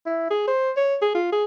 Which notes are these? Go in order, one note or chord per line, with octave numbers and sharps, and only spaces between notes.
E4
G#4
C5
C#5
G#4
F4
G#4